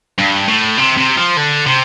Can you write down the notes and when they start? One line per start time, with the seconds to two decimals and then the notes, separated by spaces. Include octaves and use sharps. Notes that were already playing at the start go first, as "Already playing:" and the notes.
0.18 G2
0.48 A2
0.77 C3
0.97 C3
1.17 F3
1.37 D3
1.67 C3